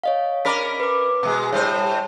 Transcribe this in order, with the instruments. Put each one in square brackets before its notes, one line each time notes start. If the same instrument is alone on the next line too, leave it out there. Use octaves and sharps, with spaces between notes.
[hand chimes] C#5 D#5 F5
[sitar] C#4 A#4 D5 [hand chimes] B5 B6
[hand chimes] B4 D6
[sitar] B2 G#3
[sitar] A2 G3 C5 [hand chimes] C#5